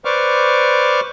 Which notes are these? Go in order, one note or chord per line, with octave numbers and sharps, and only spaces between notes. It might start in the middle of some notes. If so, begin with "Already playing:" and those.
B4 C5 D5 C#6 D6 F6